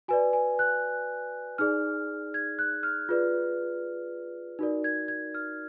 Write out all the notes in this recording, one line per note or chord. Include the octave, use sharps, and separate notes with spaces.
F#4 B4 D5 G#5
G#5
F#6
D#4 G#4 D5 F6
G#6
F#6
F6
F4 G#4 B4 D5
D#4 F#4 A#4 D5
G#6
G#6
F6